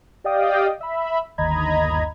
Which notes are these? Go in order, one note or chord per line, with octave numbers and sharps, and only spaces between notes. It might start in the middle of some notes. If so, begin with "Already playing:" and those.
G4 D5 D#5 F5 G5 D#6
E5 B5
G1 D#2 D#5 A#5 B5 G#6